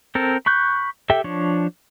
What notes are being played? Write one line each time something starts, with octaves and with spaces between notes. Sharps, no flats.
C4 A4 A#4
B5 C#6 F#6 G6
G4 A4 E5 G5
F3 D4 C#5